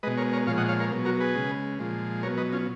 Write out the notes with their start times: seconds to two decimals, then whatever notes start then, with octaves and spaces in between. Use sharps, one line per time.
0.03 B2 G#3 B4 D#5
0.17 A#4 C#5
0.33 A#4 C#5
0.47 A#2 F3 G#3 C#5 F5
0.57 D#5 F#5
0.69 C#5 F5
0.79 A#4 C#5
0.91 B2 F#3
1.05 F#4 A#4
1.20 G#4 B4
1.35 C#3 G#3
1.79 A#2 F3 G#3
2.23 B2 F#3 A#4 C#5
2.37 B4 D#5
2.52 C#4 F4